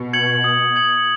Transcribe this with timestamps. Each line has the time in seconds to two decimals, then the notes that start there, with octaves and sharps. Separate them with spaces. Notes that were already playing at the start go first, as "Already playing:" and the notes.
Already playing: B2
0.13 G#6 C#7 F#7
0.44 D#6
0.76 G#6 C#7 F#7